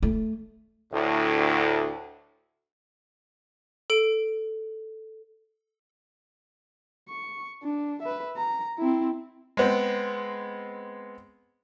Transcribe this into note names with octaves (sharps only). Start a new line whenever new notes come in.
A3
D2 A2
A4 D7
C#6
D4
B4 E5
A#5
C4 E4
G#3 B3 C4